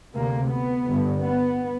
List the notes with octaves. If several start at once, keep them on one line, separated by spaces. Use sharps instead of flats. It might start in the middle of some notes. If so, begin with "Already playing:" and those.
D2 C3 A#3
B3
G1 G2
B3